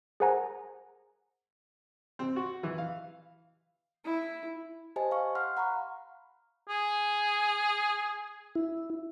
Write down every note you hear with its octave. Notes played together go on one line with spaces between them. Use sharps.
G#4 A#4 C5 F#5 G#5 A#5
C4
F#4
E3
F5
E4
G4 C5 D#5 G#5 A5
F5 C#6
F5 F#5 C6 F6
F#5 A#5 B5 C#6
G#4
E4